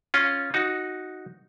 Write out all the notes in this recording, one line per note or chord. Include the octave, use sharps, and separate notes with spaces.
C#4 F4
D#4 F#4